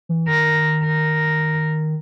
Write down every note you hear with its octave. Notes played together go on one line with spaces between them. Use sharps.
E3
D#3 A#4
A#4